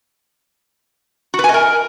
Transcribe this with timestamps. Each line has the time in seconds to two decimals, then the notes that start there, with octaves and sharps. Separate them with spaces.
1.34 F#4
1.39 B4
1.44 G#5
1.49 D#5
1.54 A#4